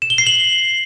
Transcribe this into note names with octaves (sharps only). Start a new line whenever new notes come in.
E7
G7
C7
F#7